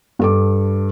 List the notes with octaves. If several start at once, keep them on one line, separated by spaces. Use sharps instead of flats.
G2 A4 D6